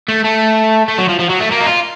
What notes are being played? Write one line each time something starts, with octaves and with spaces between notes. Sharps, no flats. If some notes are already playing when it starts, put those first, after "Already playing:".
A3
A3
A3
F#3
F3
F3
F#3
A3
A#3
D#4
F4